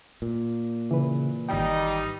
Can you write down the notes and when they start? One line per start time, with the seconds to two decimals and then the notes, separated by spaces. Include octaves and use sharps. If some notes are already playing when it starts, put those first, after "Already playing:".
0.22 A#2
0.91 C#3 E3 B4
1.49 G#1 G3 D#4 G5